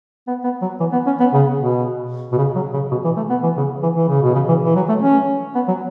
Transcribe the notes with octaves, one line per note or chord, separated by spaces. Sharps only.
B3
B3
F#3
E3
B3
C#4
B3
C#3
B2
B2
C#3
F#3
C#3
B2
E3
A3
B3
E3
C#3
E3
E3
C#3
B2
C#3
E3
E3
F#3
A3
C#4
B3
F#3